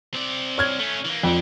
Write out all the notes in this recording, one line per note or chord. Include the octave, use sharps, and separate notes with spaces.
C4 D5
C#5 F6 G#6
A3 C#4
E3 A#3
F2 D3